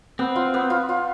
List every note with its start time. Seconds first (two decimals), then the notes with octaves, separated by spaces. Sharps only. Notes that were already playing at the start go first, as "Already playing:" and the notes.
0.19 B3 C4
0.36 F4
0.54 B3
0.70 F4
0.89 F4